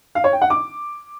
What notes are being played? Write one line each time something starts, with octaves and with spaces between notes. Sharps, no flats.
F5
C#5
G5
F#5
D6